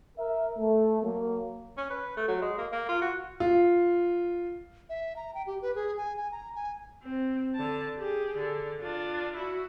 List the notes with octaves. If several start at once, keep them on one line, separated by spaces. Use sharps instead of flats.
A#4 E5
A3
F#3 A#3
C#4
B4
A3
F#3
G#3
A#3
A#3
F4
F#4
F4
E5
A#5
G5
G4
B4
G#4
G#5
G#5
A#5
G#5
C4
D3 A5
G4 G#4
D3
D4 F4
E4 F#4